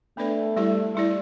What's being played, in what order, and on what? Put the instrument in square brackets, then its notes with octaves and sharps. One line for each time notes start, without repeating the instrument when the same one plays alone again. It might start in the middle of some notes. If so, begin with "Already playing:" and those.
[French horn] A3 [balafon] B3 D4 B4 D5
[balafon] G3 E4 G4 D5
G3 E4 G4 D5